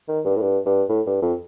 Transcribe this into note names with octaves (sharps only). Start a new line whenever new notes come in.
D#3
G2
A2
G2
G2
A2
G2
F2